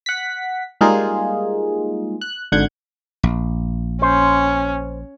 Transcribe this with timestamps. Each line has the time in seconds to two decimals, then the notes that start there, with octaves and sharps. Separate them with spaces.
0.06 F#5 B6
0.81 G3 G#3 A#3 D#4 F4 G#4
2.21 F#6
2.52 G#1 D3 F#5 G6 G#6
3.23 A#1
4.02 C#4 C5